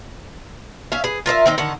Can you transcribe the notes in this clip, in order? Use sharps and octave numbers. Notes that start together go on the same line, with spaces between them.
C#4 E5 F5
G#4 B4
F4 A#4 C5 E5
D#3 C4 D#4
D3 D#3 F#5